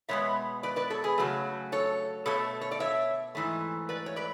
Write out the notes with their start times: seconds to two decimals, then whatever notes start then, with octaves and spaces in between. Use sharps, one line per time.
0.09 B2 G#3 B3 C#5 E5
0.63 B4 D5
0.76 B4 D5
0.90 A4 C#5
1.04 G#4 B4
1.18 C#3 F#3 A3
1.72 A4 C#5
2.26 B2 A3 A4 C#5
2.61 C#5
2.71 D5
2.80 C#5 E5
3.35 G#2 E3 A3
3.89 B4 D5
4.06 C#5
4.16 B4 D5